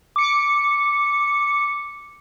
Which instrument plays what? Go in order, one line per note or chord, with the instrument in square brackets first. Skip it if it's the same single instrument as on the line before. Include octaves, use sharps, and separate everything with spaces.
[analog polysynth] D6 C#7